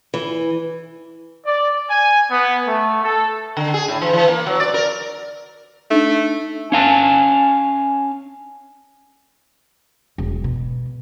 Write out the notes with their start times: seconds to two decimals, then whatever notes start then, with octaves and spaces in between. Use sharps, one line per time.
0.14 E3
1.46 D5
1.89 G#5
2.30 B3
2.66 A3
3.03 A4
3.57 D3
3.74 G#4
3.88 A2
4.02 E3
4.13 E3
4.28 A#3
4.46 F#3
4.60 D5
4.74 A#4
5.91 A3 D4 D#4
6.72 C#4 F5 G#5 A5
10.18 E1
10.44 B2